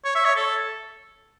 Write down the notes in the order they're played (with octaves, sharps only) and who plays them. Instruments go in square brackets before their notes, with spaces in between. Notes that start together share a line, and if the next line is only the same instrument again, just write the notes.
[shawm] C#5
E5
C#5
A4